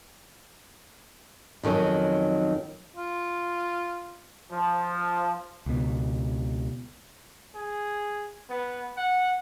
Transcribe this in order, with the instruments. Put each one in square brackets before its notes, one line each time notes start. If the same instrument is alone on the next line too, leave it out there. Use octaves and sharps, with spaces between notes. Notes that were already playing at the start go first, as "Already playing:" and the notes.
[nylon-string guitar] F2 D#3 F#3 C#4
[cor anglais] F4
[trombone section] F3
[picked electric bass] C#2 B2
[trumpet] G#4
B3
F#5